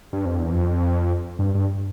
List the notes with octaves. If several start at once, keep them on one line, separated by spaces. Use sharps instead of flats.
G2
F2
E2
F2
G2
G2